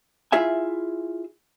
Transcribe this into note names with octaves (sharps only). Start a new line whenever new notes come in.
E4 F4 G#4 E5 G#5